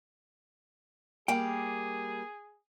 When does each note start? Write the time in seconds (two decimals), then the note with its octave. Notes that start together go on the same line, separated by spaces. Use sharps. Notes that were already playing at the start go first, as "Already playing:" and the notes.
1.28 G3 A#3 G#4 G5